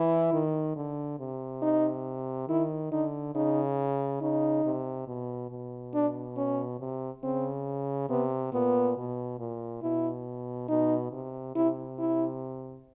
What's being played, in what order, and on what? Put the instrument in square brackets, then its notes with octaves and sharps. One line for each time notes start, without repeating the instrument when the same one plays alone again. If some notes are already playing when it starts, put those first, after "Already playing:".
Already playing: [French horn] E3 [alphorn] E4
[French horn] D#3
D3
C3
[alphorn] D#4
[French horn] D#3 [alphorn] E4
[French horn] D3 [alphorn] D#4
[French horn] C#3 [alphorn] D#4
[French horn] C#3 [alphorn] D#4
[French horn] C3
B2
B2
[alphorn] D4
C#4
[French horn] C3
[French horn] C#3 [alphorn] C4
[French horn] C3 [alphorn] B3
[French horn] A#2 [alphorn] B3
[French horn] B2
A#2
[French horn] B2 [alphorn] E4
[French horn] B2 [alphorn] D#4
[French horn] C3
[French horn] C3 [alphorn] E4
[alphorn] E4